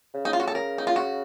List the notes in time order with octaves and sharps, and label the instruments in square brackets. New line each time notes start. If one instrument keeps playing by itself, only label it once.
[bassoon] C#3
[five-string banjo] D#4
F4
F#4
A4
[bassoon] C#3 [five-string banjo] A#4
[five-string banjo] D#4
F4
F#4